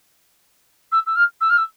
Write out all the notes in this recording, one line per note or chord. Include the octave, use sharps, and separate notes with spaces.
E6
E6
F6
E6
F6
E6